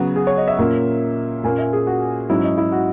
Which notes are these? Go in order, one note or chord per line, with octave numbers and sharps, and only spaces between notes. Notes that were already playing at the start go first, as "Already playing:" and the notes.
Already playing: C#3 F#3 B3 F#4
G#4
C#5
D#5
E5
A#2 A#3 C#4
A#2 A#3 C#4 G#5
E5
G#4
F#4
G#2 F#3 C#4 E4
D#4
E4
F#4